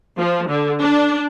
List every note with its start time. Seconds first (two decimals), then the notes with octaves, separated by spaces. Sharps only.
0.18 F3
0.49 D3
0.81 D4